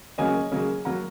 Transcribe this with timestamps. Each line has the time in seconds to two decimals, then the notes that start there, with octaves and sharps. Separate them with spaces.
0.18 C#3 F#3 A#3 C#4 D#5 G#5
0.52 C#3 F#3 A#3 C#4
0.85 F#3 A#3 F#5 A#5